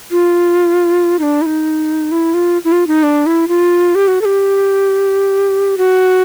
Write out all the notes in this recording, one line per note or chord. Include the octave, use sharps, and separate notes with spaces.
F4
D#4
D4
E4
D#4
E4
F4
E4
F4
D#4
D4
E4
F4
G4
F#4
A4
G4
F#4